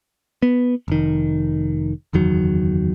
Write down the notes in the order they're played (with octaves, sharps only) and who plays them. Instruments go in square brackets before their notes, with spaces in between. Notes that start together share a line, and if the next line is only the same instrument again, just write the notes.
[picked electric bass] B3
F1 D#3
F#1 E2 D#3 F#3